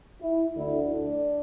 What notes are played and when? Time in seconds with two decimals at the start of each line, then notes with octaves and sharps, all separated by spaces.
0.22 E4
0.56 D2 D3 E4
0.91 D4